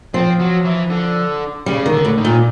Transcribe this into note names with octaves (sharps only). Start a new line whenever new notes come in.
F3 C4
F#3
E3
D3
C#3 G3
D#3
D3
A2
D#3
A#2